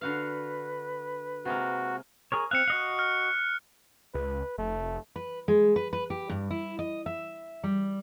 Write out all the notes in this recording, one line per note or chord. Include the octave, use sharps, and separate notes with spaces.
D3 F#4 B4 F5
C3 G#3 A#3 F#4
G#4 A#4 C#5
C4 F5 F#6 C#7
F#4 D#5 F5
F6
C#2 B4
F1 A3
B4
G#3
B4
B4
G4
G2
E4
D#5
E5
G3